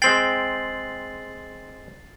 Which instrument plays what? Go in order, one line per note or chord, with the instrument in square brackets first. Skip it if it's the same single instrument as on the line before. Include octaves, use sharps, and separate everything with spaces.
[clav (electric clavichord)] G#3 C4 G5 [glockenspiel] A6 C7 F#7